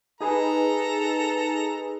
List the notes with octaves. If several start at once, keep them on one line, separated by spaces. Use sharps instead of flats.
D#4 G#4 A4 B4 A#5